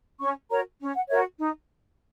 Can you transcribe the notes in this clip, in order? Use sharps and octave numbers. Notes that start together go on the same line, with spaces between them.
C#4 C#6
F#4 A#4 C#5 A#5
C#4
F#5
F#4 A#4 C#5 E5
D#4